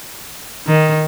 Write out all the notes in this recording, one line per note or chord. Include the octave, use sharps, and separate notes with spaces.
D#3